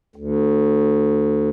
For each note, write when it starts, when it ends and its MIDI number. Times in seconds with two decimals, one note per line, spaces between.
0.16 1.50 38